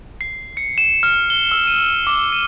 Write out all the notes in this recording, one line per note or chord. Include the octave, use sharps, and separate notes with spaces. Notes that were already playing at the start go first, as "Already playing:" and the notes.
C7
C#7
E7
F6
G7
E6
D#7
D6
D#7